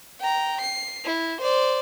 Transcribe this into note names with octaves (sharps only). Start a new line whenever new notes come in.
G5 A#5
C7
E4
C5 D5